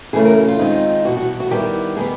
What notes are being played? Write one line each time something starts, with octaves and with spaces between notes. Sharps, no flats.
C#3 E3 A3 C#4 G#4
A#4
F#4
F4
D#3 G#3 C4 D#4
E2 B2 G3 F#4
F#4
F#4
D#3 G3 B3 E4 G4
D#3 G3 B3 G#4